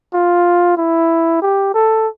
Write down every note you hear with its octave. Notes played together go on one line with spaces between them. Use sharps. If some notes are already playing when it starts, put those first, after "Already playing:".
F4
E4
G4
A4